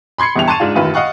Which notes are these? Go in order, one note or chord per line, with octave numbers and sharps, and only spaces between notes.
B5 C6 G#6 C7 C#7
G1 E2 G2 G4 F7
A5 C6 C#6 A6 D#7 E7
G#2 D4 F4
A1 F#2 D#3 F4 B4
D#5 F5 F#5 C#6